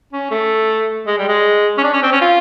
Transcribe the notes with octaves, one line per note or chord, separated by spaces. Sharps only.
C#4
A3
G#3
G3
G#3
C#4
D4
C#4
C4
C#4
F4